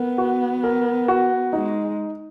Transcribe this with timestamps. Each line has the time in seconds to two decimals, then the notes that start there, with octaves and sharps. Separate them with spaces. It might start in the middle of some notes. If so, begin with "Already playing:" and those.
Already playing: B3 A#4
0.18 F#4
0.64 A#4
1.08 F#4
1.53 G#3 D#4